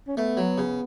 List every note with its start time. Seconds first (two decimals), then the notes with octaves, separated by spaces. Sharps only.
0.08 C#4
0.17 A3 B3
0.37 F#3
0.58 C#3